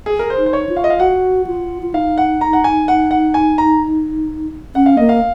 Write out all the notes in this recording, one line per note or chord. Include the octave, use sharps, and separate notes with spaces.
G#4
A#4
C5
D#4
C5
C#5
F4
F5
D#5
F5
F#4 F#5
F4
F4
D#4 F5
F#5
A#5
F#5
G#5
F#5
F#5
G#5
A#5
C#4 F#5
F5
A#3 D#5
F5